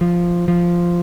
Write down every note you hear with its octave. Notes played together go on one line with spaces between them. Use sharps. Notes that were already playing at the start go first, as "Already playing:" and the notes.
F3
F3